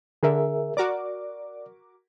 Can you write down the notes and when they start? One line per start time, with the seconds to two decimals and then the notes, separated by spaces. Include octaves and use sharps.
0.23 D3 G#4 A#4 E5
0.77 F#4 A#4 D5 D6